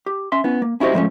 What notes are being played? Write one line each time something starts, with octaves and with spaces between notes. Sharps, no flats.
G4
C#4 E5 C6
B3 C#4 E4
A#3
C#4 E4 F#4 G4 C5 D#5
G#2 F3 A3 C#4